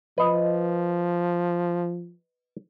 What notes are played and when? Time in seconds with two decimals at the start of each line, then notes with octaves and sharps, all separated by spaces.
0.18 F3 B4 D#5